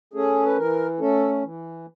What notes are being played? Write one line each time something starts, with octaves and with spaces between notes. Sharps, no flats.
A3 C#4 G#4
B4
E3 A#4
A3 C#4 A4
E3